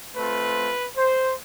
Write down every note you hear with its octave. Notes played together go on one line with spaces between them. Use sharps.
A3 C4 F4 B4
C5